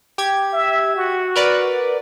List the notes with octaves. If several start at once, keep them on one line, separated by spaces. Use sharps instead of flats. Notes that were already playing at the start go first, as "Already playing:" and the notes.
G4 G#6
E5
F#4
A#4 B4 D5